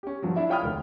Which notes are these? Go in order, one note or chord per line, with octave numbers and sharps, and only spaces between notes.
C#4 G4
G2 F3 F#3
D4 E4 E5
F4 C#5 G5 B5 D#6 F6
E1 D2